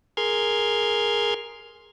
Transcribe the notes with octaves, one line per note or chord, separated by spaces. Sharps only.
G#4 A#4 C6 F6 G#6